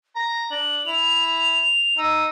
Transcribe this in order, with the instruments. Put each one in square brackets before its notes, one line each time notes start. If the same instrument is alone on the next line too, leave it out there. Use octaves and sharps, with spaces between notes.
[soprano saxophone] A#5 [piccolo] A#6
[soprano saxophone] D4 [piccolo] F#7
[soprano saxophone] E4 [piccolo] F7
[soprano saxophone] D#4 [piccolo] E6